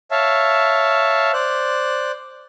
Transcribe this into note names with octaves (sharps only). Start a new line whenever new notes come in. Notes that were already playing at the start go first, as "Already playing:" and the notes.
C#5 E5 F5 A5
C5 D5 F#6